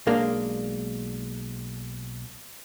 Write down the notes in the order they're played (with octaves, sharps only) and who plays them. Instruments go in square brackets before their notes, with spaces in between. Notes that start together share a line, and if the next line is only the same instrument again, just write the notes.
[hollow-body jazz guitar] B1 G#3 A#3 D4